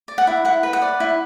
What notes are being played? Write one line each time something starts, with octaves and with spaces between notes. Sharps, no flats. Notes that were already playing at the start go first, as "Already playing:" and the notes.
D5
F#5
E4
E4 F#5
B4
F#5
D5
E4